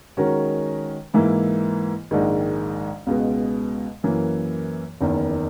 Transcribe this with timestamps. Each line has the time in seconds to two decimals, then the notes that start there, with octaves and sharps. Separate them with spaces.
0.17 D#3 G#3 C#4 F#4 A#4
1.14 G#2 E3 A#3 E4
2.11 A#1 G#2 D#3 G#3
3.07 C#2 B2 G#3 B3
4.03 F#2 E3 A#3
5.01 F#1 E2 D#3